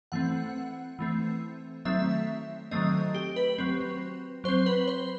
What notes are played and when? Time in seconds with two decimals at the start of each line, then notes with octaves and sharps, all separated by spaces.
0.12 E3 A3 C4 F#5
0.99 E3 A3 C4
1.85 D#3 F#3 A3 C4 E5
2.71 D#3 F#3 A3 C4 D#5
3.15 G4
3.36 B4
3.58 F#3 C4
4.44 F#3 C5
4.48 C4
4.66 B4
4.88 C5